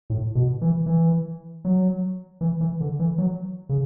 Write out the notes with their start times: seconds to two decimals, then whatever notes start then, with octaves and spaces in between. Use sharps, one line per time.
0.10 A2
0.35 B2
0.61 E3
0.86 E3
1.65 F#3
2.41 E3
2.61 E3
2.80 D3
2.99 E3
3.18 F#3
3.69 C#3